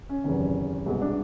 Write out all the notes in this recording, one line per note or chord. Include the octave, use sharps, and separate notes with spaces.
C#4
F#1 E2 C3 D#3
C2 B2 G#3
D4